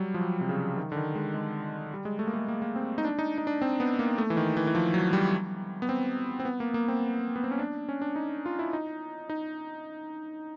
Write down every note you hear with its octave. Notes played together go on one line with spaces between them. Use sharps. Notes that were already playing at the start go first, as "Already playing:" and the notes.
Already playing: F#3 G3
F3
F#3
C3
C#3
D#3
D3
D#3
G#3
G#3
G3
G#3
A3
A#3
A3
A#3
A#3
C4
D#4
D4
D#4
D#4
D4
C4
B3
A#3
A3
E3
D#3
E3
E3
F3
F#3
G3
B3
C4
C4
B3
A#3
A#3
C4
B3
C4
C#4
D4
C#4
D4
D#4
F4
E4
D#4
D#4